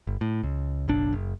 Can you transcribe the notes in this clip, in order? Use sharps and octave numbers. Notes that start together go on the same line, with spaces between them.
G1
A2
C#2
F#1 B1 D4
F#1